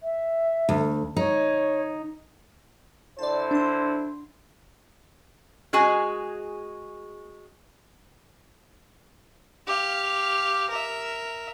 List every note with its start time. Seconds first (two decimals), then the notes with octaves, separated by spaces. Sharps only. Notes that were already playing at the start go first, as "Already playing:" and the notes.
0.01 E5
0.69 D2
1.16 D#4 C#5
3.19 D3 E4 C5 D5 A5
3.51 D4 C6
5.73 G#3 F#4 G#4 G#5
9.67 G4 F5
10.70 A#4 E5